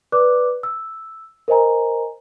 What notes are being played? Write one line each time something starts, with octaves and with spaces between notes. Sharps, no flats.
B4 D5 D6 F#6
E6
A#4 C5 D#5 G#5 A#5